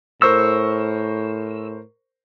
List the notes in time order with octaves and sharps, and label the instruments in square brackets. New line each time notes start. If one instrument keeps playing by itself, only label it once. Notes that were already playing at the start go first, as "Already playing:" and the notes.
[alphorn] A2 [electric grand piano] A#4 C5 C#6 [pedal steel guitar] E6